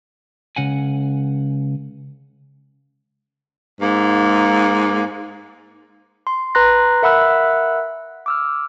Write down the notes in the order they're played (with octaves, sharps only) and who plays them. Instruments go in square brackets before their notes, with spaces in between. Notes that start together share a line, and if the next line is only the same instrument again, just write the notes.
[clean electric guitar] C#2 C#3 F#5 G#5
[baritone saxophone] G#2 [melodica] A#3
[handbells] C6
B4 A#5 C6 F#6 A#6
A#4 E5 F#5 B5 E6 F#6
D6 E6 F6